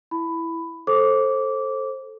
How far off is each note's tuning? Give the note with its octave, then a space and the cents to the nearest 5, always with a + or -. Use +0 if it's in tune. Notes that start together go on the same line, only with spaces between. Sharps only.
E4 +0 B5 +10
A4 +0 C5 +20 D6 -20